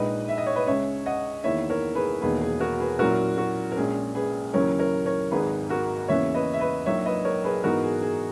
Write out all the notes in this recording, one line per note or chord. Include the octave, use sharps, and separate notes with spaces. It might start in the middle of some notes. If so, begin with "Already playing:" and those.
Already playing: A#1 A#2 G#3 D#4 B4 D#5
E5
D#5
C#5
B4 D#5
C#2 C#3 G#3 C#5 E5
D#5 F#5
E2 D#3 A#3 E4 C#5 E5
A#4 C#5
G#4 B4
E1 E2 D#3 A#3 D#4 G#4 B4
G#4
F#4 A#4
G#4 B4
A#2 F#3 C#4 E4 F#4 A#4
F#4
A#4
A#1 A#2 G#3 C#4 G#4
G#4 B4
D#2 C#3 F#3 C#4 E4 A#4 C#5
A#4 C#5
A#4 C#5
G#1 G#2 D#3 G#4 B4
F#4 A#4
E2 C#3 E3 A#3 C#4 C#5 E5
B4 D#5
E5
B4 D#5
A#1 A#2 F#3 A#3 D#4 C#5 E5
B4 D#5
A#4 C#5
G#4 B4
G#2 E3 B3 D#4 F#4 A#4
G#4
G#4